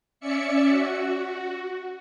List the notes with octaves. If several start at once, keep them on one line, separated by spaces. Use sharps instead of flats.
C#4 D5 E5 C#7
F#4